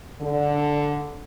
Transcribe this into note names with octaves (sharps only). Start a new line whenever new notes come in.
D3